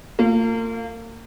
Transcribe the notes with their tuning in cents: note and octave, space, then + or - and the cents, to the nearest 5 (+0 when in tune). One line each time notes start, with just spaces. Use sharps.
A#3 -40 F4 +0